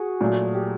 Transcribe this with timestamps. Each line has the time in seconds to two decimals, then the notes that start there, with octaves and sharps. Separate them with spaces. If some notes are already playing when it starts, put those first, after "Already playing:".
Already playing: F#4 G#4
0.21 A#2 F#3 A3
0.54 G4